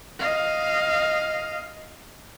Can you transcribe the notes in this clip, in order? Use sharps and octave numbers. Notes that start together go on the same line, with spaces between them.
D#5 F5